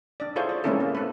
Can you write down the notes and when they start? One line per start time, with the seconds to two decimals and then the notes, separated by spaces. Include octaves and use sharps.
0.20 D4 D5
0.36 E4 F4 G#4 A4 C5 C#5
0.49 D5
0.64 G#3 A#3 C4 C#4 E4 A4
0.80 A#3
0.95 A4 B4